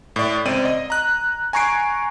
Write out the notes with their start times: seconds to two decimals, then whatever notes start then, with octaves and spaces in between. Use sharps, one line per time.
0.16 A2 D5
0.45 C#2 C4 D5 D#7
0.65 D#5
0.90 A#5 F#6
1.53 G#5 A#5 C#6 G#6 C7 D7